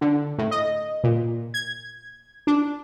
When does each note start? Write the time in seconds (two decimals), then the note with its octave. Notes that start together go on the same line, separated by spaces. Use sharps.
0.01 D3
0.38 A2
0.51 D#5
1.04 A#2
1.54 G#6
2.47 D4